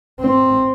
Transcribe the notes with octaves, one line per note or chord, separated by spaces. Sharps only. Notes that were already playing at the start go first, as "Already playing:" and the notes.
C4